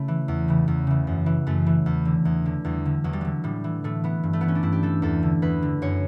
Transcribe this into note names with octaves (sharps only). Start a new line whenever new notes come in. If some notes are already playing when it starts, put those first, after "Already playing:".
Already playing: C#3 A3 E4
E3
E2
C#3 E3
E2
C#3 E3
F#2
E3
F#2 A3
E3
E2
D3
E2
D3
E2 G3
D3
E2 F#3
G3
D3 F#3
A2 G3
E3
A2 A3
E3 B3
G2
A3
E3 B3
C#4
D4
G2 E4
G4
E3 A4
E2 A4
D3
E2 B4
D3
F#2 C#5